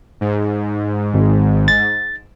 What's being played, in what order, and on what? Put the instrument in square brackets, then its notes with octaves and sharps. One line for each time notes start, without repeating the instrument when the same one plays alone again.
[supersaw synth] G#2
[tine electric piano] G#1
A6